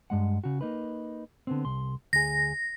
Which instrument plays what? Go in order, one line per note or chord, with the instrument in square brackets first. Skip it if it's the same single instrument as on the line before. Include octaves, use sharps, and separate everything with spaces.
[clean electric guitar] G2 G#3 F#5
C#3 F#4
A#3 D#4 B4
D3 B3 C4
C2 C6
[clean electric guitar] D2 G#4 [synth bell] A#6